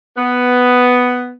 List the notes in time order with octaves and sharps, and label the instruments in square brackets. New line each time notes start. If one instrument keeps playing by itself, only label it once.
[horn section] B3